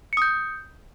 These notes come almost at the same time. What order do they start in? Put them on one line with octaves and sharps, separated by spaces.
C#7 D#6 G6